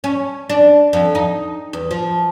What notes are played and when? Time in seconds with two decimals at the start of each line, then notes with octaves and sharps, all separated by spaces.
0.04 C#4
0.50 D4
0.93 F2
1.15 D#4
1.73 E2
1.91 F3